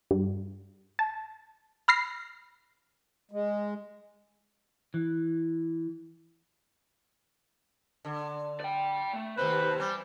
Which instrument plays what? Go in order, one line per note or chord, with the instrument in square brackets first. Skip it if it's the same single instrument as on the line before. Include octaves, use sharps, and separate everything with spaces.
[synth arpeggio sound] G2
A5
B5 F6 A#6 C7
[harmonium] G#3
[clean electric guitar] E3
[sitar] D3
[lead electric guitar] D5 G5
A3
[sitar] D#2 C3 C4 [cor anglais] B4 [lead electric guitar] C5
[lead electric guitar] E3 [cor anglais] G3 [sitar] C4